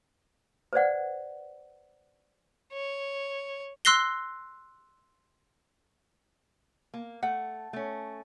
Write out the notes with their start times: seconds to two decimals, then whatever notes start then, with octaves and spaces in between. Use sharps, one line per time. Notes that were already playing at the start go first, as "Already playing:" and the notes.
0.73 B4 C5 D5 F#5
2.73 C#5
3.85 C6 E6 F#6 A#6 C7 G7
6.94 A#3
7.23 A3 F#5
7.73 A3 C#4